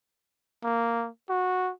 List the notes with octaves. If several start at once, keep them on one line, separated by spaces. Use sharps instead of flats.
A#3
F#4